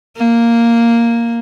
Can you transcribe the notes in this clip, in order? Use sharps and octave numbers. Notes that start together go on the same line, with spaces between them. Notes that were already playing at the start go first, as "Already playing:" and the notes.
A#3